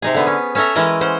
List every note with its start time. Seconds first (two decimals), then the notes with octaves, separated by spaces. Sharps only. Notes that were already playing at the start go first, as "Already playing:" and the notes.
0.02 C3 D#4 G#4
0.15 D3 B3
0.27 C#4
0.55 C#4 A4 C#5 E5 A#5
0.75 E3 G#3 C#4 A#4 D#5
1.01 C#4 C5 F#5